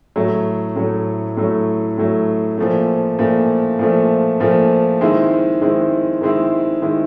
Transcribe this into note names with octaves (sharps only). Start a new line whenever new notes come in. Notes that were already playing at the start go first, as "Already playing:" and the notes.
A2 F#3 A3
A2 F#3 A3
A2 F#3 A3
A2 F#3 A3
A#2 F3 A3
A#2 F3 A3
A#2 F3 A3
A#2 F3 A3
D#3 G#3 C4 E4
D#3 G#3 C4 E4
D#3 G#3 C4 E4
D#3 G#3 C4 E4